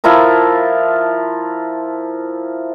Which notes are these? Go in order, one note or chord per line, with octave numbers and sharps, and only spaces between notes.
F3 E4 F4 A#4